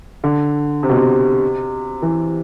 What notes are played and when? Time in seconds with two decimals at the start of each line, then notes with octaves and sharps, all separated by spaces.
0.24 D3
0.83 C3
0.90 B2
0.97 C3
2.02 E3